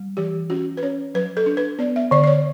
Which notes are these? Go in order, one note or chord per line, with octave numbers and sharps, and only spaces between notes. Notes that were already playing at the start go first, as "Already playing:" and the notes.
Already playing: G3
E3 G4
C#4 F#4
B4
C#4 C#5
F#3 B4
A4
D4
B4
B3 D5
E5
D3 D5
D5
C#5